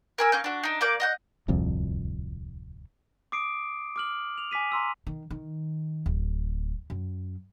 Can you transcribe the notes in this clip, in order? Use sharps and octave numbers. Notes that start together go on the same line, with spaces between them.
A#4 G#5 E6
A#3 C#4 G6
D4 F#4
D4 D#4
A#3 D5 D6 G6
D#5 F#5 G6
D1 C2 F2
D6 D#6 C7 D7
D6 F6 F#7
F7
G#5 D6 B6 D#7
A#5 C6 E6
D#3
D#3
D1
F#2